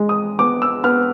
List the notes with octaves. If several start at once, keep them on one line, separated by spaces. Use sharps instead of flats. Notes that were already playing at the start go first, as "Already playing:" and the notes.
Already playing: G#3
D#6
B3 D6
E6
B3 F6